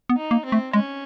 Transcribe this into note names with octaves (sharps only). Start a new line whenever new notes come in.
B3
D#4
A#3
C4
A3
G#3 C#4